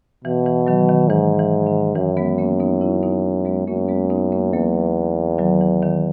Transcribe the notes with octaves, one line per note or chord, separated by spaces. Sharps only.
B2 E3
E3
D#3 F#3
D#3
G#2 E3
E3
D#3
F#2 E3
G#3 B3
A#3 C#4
B3 D#4
C#4 E4
B3 D#4
G#3 B3
F#2 A#3 C#4
G#3 B3
B3 D#4
A#3 C#4
E2 F#3 A#3
D#3 F#3
E3
D#3